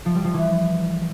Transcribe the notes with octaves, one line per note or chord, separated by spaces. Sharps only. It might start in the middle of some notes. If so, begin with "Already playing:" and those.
F3
G3
F3
E3